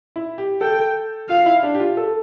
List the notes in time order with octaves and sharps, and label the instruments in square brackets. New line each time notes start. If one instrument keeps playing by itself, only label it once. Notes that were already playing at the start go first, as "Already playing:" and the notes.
[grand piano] E4
G4
[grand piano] A4 [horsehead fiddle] G5
[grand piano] F4 [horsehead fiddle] F5
[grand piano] E4
D4
G4
F4
A4